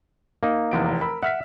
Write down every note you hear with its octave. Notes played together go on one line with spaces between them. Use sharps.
A#3 D#4
F1 E2 D7
A#4 B5 E6
E5 F#5 F6 B6